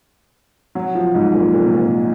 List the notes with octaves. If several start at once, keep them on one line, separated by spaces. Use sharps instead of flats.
F#3
F3
G#2
A#2
A#2
C3
A#2